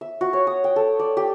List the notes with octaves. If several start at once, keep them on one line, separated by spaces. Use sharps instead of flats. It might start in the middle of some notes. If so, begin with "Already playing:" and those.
E5
F#4
C#5
D#6
G5
A4
D5
G4